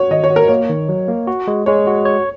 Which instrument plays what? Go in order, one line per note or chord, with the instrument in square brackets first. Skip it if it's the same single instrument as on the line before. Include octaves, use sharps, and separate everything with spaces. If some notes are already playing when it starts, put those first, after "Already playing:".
Already playing: [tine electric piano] F#4 [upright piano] C#5
[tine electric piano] D#3 [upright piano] D#5
[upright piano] C#5
[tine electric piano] F#4
[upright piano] A#4
[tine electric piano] A#3 [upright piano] C#5
[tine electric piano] D#3
F#3
A#3
F#4
G#3
[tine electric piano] G#3 [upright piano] C#5
[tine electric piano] F#4
C#5